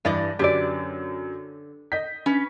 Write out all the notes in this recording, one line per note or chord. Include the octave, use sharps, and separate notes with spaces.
G2 E3 G3 D5 D#5
F#2 D3 G4 B4 D5
D#5 G6 B6
C#4 B4